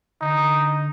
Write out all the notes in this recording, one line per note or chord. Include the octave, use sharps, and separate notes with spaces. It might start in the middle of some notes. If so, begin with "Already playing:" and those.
D3 D#4